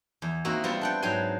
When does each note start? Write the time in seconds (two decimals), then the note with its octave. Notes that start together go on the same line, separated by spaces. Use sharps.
0.22 E2
0.45 A#3 C4 D#4 F#4 E5
0.64 G3 B3 C4 E4 F4
0.81 D4 F#5 G5
1.02 G#2 F#3 C4 G5 G#5 C6